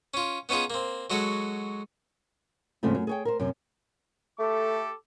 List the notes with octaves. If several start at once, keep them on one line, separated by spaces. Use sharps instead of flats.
C#4 F4
B3 C#4 D#4 F4 G#4
A#3 C4
F#3 G#3 F#4 A4
E2 G#2 C#3 F3 A3 C4
F#2
G#4 C#5 G5
A#4 C5
F#2 C3
A3 G4 A4 D6